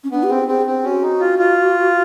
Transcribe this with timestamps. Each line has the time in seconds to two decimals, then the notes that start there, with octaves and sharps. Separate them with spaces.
0.04 C#4
0.12 B3 D4
0.23 G4
0.29 C4 G#4
0.48 C4 G#4
0.66 C4
0.84 C#4 F#4
1.02 D#4
1.20 F4
1.39 F4